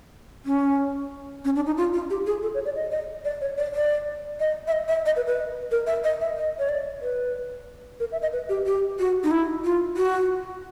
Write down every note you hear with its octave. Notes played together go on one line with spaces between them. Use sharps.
C#4
C#4
D4
D#4
F4
F4
G4
G#4
A4
C#5
D5
D#5
D#5
D5
C#5
D5
D5
D#5
E5
D#5
E5
D#5
B4
B4
A#4
E5
D#5
E5
D#5
C#5
D5
B4
A#4
E5
D#5
B4
G4
G4
F#4
D#4
E4
F4
F#4